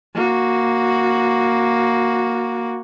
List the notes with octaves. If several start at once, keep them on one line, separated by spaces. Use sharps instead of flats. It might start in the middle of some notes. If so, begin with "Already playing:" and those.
A#3 F#4